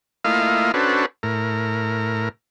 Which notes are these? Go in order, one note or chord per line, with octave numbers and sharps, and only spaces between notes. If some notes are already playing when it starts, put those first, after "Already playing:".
A3 A#3 E4 F4 D#5 F5
C#4 D4 F#4 A4 B4 C5
A2 A#4